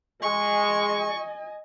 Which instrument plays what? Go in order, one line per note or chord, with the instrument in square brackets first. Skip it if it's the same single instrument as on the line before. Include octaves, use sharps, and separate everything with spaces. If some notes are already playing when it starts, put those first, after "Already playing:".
[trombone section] G#3 [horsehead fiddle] D#5 G#5 [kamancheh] C#6